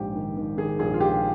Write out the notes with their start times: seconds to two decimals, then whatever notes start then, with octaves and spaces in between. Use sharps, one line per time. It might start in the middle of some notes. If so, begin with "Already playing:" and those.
Already playing: A#1 G#2 G4
0.15 D#3
0.37 D#3
0.57 D#3 G#4
0.79 A#1 G#4
0.94 F4
1.00 A#1 G4